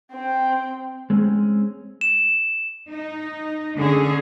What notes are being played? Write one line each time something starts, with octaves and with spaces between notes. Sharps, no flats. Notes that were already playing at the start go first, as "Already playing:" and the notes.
C4 G5
G#3 C4 C#4
E7
D#4
D3 C#4 D4 G#4